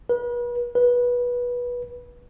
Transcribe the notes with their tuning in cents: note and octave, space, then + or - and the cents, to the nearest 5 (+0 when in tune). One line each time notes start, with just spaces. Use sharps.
B4 -40
B4 -20